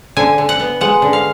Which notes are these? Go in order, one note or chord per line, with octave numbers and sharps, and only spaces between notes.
D3 G#5
D3
F#5
B3
G#3 F#5
D3
F5